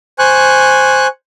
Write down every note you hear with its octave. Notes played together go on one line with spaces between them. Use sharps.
C5 G#5 C#6 F#6